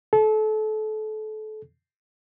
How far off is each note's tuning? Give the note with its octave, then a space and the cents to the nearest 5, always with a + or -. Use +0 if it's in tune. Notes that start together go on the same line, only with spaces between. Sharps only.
A4 -30